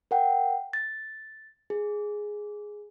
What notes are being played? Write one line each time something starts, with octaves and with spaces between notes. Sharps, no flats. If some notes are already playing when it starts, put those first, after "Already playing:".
A#4 F#5 G5
A6
G#4